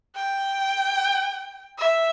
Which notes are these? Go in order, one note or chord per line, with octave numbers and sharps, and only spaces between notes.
G5
E5